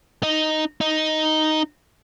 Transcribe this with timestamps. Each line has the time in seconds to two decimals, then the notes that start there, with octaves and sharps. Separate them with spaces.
0.23 D#4
0.81 D#4